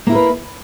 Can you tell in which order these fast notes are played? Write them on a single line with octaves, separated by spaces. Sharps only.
A#3 E4 A#4 B4